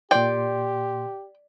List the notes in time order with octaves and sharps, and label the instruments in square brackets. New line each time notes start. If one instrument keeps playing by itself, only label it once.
[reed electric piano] A#2 C6 [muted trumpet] G4 [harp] D5 [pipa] G5